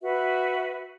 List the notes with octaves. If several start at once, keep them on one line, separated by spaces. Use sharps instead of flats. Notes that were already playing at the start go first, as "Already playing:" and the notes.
F#4 B4 E5